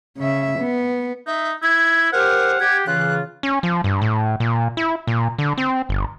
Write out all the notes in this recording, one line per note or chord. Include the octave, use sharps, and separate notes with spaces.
C#3 E5
B3
D#4 E5
E4 G#6
G4 A#4 C5 F#5 F6
G4 G#6
C#3 E3 F4 F#6
C#4
F3
G2
A2
A#2
E4
A#2
D3
C4
G1